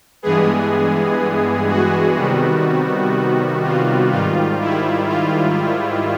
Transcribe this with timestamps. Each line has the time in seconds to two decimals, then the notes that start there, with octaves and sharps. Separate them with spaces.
0.22 G2 E3 G#3 B3 G#4
1.68 F#4
2.17 C3 D#3 G3 B3
3.64 F4
4.12 G#2 D#3 G3 F4
4.61 E4
5.09 F4